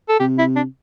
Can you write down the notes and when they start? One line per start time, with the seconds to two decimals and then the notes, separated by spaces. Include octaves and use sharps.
0.09 A4
0.20 C3 G4
0.39 E4
0.56 D4